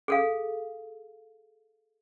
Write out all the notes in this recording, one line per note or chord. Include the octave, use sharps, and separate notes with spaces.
G#4 A4 F5